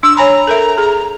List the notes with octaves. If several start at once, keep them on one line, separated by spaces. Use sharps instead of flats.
D4 E6
C#5 G#5 A#5 B5
A4 A#4 E5
G#4